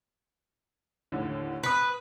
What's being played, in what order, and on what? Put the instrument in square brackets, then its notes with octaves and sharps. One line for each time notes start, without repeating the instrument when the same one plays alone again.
[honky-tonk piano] D#2 A2 D3
[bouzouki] B4 [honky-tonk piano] D#6 B6